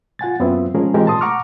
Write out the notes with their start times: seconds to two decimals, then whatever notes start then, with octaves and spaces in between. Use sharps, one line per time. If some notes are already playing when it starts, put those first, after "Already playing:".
0.19 F4 F#5 G#5 A6
0.40 F#2 B3 C4 F4 E5
0.74 F3 G#3 C#4 G#4 A#4
0.94 E3 G#3 C4 F4 G4 A#4
1.06 A#2 A5 C6 D#6
1.21 F#5 A#5 C#6 D6 F6